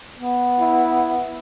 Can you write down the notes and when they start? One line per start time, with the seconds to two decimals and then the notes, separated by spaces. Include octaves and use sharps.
0.20 B3
0.59 E4